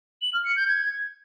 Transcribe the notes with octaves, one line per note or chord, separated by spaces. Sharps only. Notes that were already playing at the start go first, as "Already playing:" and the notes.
F#7
F6
C#7
G6
G#6